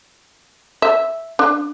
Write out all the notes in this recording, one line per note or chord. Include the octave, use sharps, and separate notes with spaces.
E5
D4